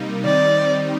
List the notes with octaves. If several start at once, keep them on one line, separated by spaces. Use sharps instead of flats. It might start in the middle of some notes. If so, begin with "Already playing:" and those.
Already playing: C3 G3 A#3 D#4
D#3 G3 C4 D#4 D5